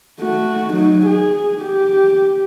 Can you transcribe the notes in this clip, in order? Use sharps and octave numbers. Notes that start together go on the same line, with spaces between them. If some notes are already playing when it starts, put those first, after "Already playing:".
A3 F#4
F#3 D#4
G#4
G4